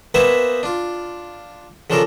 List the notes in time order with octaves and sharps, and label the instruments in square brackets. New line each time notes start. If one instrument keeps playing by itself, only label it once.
[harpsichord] A#3 B3 B4 C5 E5 G#5
D4 F4
C#3 F3 D4 F4 A4 A#4